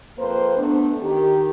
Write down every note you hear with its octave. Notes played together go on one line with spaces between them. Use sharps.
F2 A#3 B4 C5
A3 B3 D4
D#3 G4